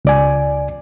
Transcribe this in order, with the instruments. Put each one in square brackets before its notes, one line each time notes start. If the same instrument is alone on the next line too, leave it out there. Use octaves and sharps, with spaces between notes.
[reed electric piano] C#2 D5 G#5